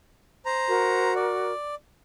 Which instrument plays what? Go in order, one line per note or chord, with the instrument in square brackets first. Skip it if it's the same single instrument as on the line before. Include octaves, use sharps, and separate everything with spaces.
[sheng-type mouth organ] C5 A#5
[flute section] F#4 A#4
[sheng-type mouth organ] D5